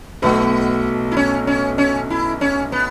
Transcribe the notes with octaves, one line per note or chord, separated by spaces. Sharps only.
B1 B2 A3 B3
E4
C#4
C#4
C#4
E4
C#4
B3